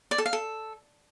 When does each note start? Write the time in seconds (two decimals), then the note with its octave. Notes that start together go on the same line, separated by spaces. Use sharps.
0.11 D5
0.18 A4
0.26 F5
0.33 A4